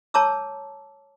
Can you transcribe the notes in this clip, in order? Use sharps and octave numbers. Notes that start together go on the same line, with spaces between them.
C#5 A5 A#5 D6 E6